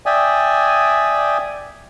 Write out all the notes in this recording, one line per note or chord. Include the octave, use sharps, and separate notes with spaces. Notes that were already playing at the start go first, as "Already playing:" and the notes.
D5 E5 G5 G#5 D#6